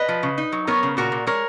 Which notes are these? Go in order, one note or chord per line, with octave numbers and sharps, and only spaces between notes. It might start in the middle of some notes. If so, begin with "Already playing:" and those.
Already playing: B4 D#5
F3
C#3
D#4
F#3
B3 A#4 C#5
C#3
A#2 F#4 A#4
A#2
G#3 A#4 C#5